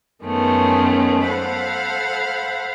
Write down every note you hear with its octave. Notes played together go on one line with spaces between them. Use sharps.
F#2 D#3 G#3 A3 B3 C#4
A4 C5 F5 F#5 B5